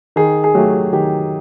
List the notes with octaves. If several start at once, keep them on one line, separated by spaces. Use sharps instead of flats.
D#3 G#4
G#4
F#3 A3 G4
D#3 G4